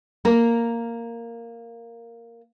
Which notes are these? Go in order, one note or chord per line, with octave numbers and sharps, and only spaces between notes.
A#3 A#4